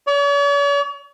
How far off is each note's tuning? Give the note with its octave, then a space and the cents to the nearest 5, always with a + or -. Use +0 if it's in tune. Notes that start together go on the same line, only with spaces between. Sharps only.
C#5 +45